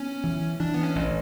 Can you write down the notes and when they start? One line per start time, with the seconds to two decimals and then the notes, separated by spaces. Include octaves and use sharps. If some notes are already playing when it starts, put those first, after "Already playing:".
Already playing: B3 C#4
0.24 E3
0.60 E3 D4
0.74 B3
0.83 C#4
0.96 A1